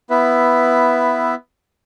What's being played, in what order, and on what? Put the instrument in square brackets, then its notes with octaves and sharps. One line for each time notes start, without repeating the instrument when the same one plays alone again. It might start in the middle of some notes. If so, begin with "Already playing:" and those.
[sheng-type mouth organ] B3 E4 B4 E5